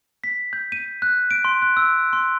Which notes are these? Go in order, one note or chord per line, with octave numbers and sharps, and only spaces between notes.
B6
G6
D#7
F#6
D7
C6
F#6
E6
C6